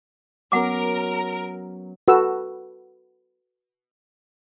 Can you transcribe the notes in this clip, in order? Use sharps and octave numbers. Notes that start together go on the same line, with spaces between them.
F#3 B3 C#4 A#4 F#5 D6
F#4 A4 B4 F#5 E6